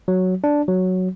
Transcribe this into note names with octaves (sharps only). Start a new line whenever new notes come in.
F#3
D4
F#3